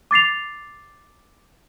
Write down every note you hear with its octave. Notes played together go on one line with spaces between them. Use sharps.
D6 A6 C7 F7